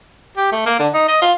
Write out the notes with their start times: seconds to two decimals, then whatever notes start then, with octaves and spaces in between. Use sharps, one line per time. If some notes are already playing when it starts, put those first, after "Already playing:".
0.37 G4
0.52 A3
0.66 A#3
0.79 D3
0.94 D#4
1.08 D#5
1.22 F4